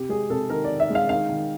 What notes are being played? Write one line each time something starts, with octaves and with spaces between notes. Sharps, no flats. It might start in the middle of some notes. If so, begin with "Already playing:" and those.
Already playing: C3 G4
G#3 G#4
C3 A4
D#3 A#4
D5
D#3
E5
G#3 F5
D#3 F5
D#3